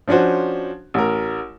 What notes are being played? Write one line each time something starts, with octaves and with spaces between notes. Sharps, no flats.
F3 C#4 D4 F#4 C5
A1 A#4